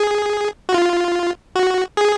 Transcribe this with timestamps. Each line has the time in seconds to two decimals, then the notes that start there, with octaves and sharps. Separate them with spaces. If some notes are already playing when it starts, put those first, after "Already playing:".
Already playing: G#4
0.69 F#4
0.74 F4
1.56 F#4
1.97 G#4